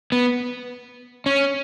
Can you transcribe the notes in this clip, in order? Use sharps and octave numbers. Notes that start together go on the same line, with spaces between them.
B3
C#4